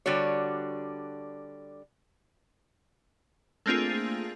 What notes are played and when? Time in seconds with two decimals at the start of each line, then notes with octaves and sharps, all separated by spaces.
0.06 D3 G3 D4 F#4 C#5
3.66 A3 A#3 C4 D4 F4 G#4